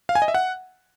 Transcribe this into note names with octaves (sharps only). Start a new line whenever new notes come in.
F5
G#5
D#5
E5
F#5